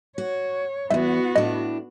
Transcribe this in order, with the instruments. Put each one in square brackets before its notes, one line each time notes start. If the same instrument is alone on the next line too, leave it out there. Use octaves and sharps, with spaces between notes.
[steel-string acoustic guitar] F#4 [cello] C#5
[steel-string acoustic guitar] E2 G#2 [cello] B3 F#4 [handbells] E5
[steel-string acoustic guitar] A2 D4 [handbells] D#5